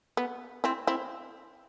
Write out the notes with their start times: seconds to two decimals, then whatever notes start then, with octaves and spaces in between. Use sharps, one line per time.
0.17 B3
0.64 C4 E4
0.87 C4 E4